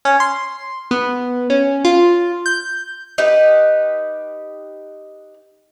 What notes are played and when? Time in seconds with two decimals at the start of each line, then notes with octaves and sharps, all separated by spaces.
0.05 C#4
0.20 C6
0.91 B3
1.50 C#4
1.85 F4
2.46 G6
3.18 D#4 G4 B4